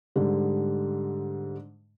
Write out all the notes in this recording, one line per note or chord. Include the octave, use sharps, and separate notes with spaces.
G#2 D3 G3